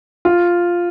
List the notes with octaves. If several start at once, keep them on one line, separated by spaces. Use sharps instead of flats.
F4